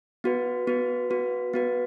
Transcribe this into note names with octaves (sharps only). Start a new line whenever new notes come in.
B3 F#4 B4
B3 F#4 B4
B3 F#4 B4
B3 F#4 B4